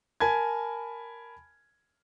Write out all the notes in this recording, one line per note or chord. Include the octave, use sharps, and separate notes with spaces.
A#4 G#5 A5 B5 G#6